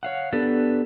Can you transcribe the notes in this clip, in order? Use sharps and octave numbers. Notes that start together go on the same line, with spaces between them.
C#5 F5 F#5
B3 D4 G4 A4 B4